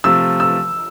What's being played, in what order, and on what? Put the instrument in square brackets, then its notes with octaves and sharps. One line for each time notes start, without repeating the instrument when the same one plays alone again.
[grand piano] C3 F3 A3 [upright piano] E6
[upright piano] E6